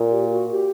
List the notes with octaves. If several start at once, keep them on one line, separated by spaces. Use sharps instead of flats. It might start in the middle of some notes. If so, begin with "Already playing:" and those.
Already playing: A#2
G4
F#4
G4